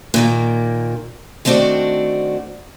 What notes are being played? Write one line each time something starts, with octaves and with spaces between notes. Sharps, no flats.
A#2 D#3 A#3
D#3 A3 C4 D4 F#4 D5